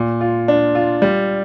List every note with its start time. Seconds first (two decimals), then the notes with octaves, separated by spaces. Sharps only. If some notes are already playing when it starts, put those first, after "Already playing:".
Already playing: A#2
0.21 F4
0.48 D4
0.75 F4
1.02 G3